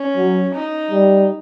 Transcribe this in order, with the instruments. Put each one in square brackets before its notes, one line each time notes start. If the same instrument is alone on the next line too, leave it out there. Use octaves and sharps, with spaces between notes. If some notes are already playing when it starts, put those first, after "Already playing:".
Already playing: [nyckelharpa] C#4
[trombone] F#3
[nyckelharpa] D#4
[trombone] G3